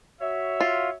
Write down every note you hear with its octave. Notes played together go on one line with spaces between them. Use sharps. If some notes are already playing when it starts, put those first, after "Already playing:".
F#4 C#5 E5
F4